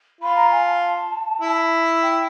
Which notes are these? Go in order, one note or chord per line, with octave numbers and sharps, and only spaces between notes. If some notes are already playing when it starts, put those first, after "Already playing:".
F4 B5
A#5
G#5
A5
E4
G5